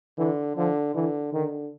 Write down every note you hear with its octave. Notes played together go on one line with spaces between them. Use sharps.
D3 E3
D3 F3
D3 E3
D3 D#3